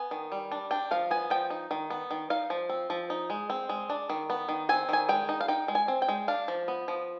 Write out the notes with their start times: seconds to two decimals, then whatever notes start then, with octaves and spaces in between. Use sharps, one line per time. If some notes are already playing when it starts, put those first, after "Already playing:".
Already playing: B3 G#5
0.11 D#3
0.32 G3
0.51 D4
0.71 D4 G5
0.91 F3 F5
1.11 B3 G#5
1.30 F3 G5
1.50 D#4
1.71 D#3
1.90 B3
2.11 D#3
2.30 D#4 F5
2.50 F3
2.69 C4
2.90 F3
3.10 D#4
3.30 G#3
3.50 C4
3.69 G#3
3.90 D4
4.10 D#3
4.30 B3
4.49 D#3
4.69 C4 G#5
4.89 D#3 G#5
5.09 G#3 G5
5.29 D#4
5.41 F5
5.48 D#4 G5
5.68 G#3
5.75 G#5
5.88 C4
6.02 G5
6.08 G#3
6.28 D4 F5
6.48 F3
6.68 B3
6.88 F3